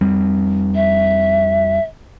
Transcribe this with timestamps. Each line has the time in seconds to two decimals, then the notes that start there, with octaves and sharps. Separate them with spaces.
0.01 F2 G3 C4
0.75 E5